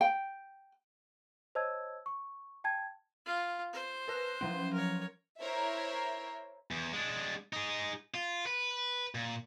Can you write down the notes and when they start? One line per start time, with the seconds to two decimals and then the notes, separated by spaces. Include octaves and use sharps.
0.01 G5
1.55 C5 C#5 D#5 A5 E6 G#6
2.06 C#6
2.64 G5 A5 G#6
3.26 F4
3.73 C5
4.08 A#4 B4 F#6
4.41 F3 F#3 C#4
4.73 A#4 C#5
5.40 E4 A#4 C5 C#5 E5
6.71 E2
6.93 G#3 D4
7.53 D#4 G#4
8.14 F4
8.46 B4
9.15 A#2